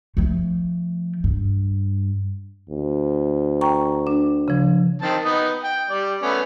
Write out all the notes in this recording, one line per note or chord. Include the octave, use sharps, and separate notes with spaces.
F3 A3
G2
D2
G5 A#5 C#6
D4
C#3 F3
D#3 C4 A5
B3 D#4
G5
G3 D5
A3 B3 C#4